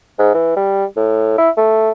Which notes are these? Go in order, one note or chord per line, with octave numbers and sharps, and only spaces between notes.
G#2
E3
G3
A2
E4
A3